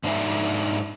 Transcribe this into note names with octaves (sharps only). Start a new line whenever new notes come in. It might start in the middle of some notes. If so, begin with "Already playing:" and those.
G#2 D4 D#4 C5 E5 G#5